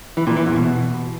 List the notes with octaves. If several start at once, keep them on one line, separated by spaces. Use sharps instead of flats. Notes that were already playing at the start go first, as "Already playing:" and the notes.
E3
A#2
E3
E2
B2